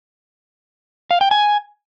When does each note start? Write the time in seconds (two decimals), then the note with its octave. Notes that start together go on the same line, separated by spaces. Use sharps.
1.11 F5
1.21 G5
1.31 G#5